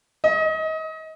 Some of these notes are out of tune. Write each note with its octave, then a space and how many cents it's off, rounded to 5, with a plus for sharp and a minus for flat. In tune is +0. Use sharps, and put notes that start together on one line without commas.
D#5 +30